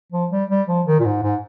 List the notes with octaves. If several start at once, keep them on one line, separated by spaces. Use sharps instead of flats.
F3
G3
G3
F3
D#3
A#2
G#2
G#2